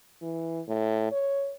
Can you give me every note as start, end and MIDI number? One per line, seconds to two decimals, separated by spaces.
0.22 0.61 52
0.68 1.11 45
1.12 1.55 73